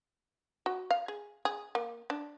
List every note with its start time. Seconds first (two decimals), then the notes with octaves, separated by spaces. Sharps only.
0.66 F#4
0.90 F5
1.08 G#4
1.45 G#4
1.75 A#3
2.10 D4